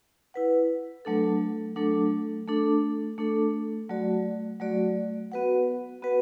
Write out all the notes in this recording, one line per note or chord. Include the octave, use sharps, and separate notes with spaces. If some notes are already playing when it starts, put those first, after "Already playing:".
E4 B4 F#5
F#3 A3 D4 A4
F#3 A3 D4 A4
A3 D4 A4
A3 D4 A4
F#3 A3 F#4 D5
F#3 A3 F#4 D5
B3 F#4 B4 F#5
B3 F#4 B4 F#5